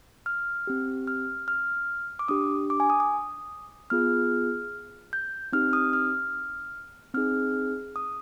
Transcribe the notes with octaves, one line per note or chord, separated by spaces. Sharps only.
F6
C4 G4
F6
F6
D6
D4 G4 D#6
D6
G#5
D#6
D#6
B3 F4 G#4 F6
G6
C4 D#4 G4 F6
D#6
F6
C4 D#4 G#4 F6
D#6